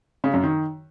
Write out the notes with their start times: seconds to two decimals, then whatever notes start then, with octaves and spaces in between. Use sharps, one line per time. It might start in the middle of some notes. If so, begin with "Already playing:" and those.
0.24 C#3
0.34 F#2
0.44 D#3